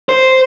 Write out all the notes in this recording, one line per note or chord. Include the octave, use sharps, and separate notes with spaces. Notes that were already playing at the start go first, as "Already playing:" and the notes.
C5